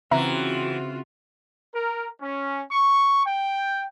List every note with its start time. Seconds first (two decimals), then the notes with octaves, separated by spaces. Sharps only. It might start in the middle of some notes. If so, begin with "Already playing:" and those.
0.11 C#3 E3 C4 F4 F#4 E5 A#5
1.75 A#4
2.21 C#4
2.70 C#6
3.26 G5